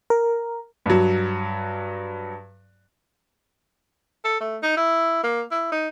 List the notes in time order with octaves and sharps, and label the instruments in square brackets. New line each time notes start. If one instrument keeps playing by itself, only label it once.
[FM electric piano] A#4
[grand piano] G2 F#3
[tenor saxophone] A4
A3
D#4
E4
A#3
E4
D#4